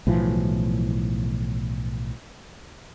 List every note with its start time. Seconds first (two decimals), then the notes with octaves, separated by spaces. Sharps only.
0.07 B1 A2 E3 F3